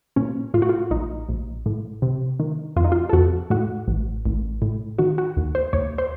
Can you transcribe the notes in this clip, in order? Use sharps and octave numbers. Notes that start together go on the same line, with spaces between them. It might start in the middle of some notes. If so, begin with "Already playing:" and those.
A#2 C#4
A2 F4
F#4
F4
A#1 D#4
A#1
A2
C3
D#3
F2 F4
D#4
F4
A4
F2 F#4
A2 F#4
A1
A1
A2
D#3 F#4
F#4
D#2
C5
D#2 C#5
C5